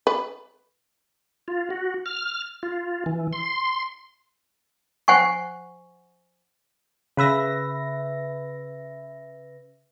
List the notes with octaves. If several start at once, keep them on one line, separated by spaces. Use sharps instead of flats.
B4
F4
F#4
F6
F4
E3
C6
C5 F#5 G#5 C#6
C#3 B4 E5 A#6